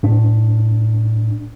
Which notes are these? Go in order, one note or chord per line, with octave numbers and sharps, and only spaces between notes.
A2 D4